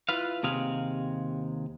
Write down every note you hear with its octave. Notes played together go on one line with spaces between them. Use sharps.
E4 F4 B4 F5
D#2 C3 G#4 F5